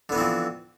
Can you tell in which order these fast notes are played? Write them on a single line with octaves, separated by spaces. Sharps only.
D3 B3 E3 C4 F3